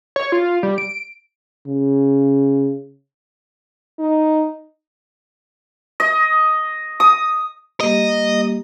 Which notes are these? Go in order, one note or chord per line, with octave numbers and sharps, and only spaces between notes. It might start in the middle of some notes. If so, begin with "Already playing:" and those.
C#5
F4
G3
D7
C#3
D#4
D#5
D#6
G3 A#3 G4 D#5